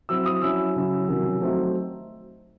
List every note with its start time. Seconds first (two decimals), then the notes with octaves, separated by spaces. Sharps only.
0.09 F#3 C4 E4 E6
0.26 D#6
0.42 F#3 C#4 E4 E6
0.76 C#3 F#3 C#4 E4
1.08 C3 D#3 F#3 C#4
1.42 F#3 A3 C4 D#4